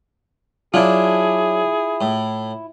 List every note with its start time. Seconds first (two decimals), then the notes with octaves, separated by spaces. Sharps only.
0.74 F#3 D4 E4 F4 G#4
2.01 A2